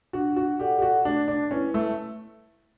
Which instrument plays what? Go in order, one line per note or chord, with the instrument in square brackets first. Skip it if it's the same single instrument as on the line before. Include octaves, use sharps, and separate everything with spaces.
[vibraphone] D4 [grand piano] F#4
[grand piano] F#4
[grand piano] G4 [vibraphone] A4 D5 F#5
[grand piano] G4
F#4
[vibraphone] A3 [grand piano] D4
[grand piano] D4
[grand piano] C#4 [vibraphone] E4 B4
[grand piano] A3